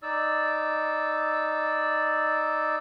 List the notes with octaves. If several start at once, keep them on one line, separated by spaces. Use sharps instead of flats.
D#4 D5 E6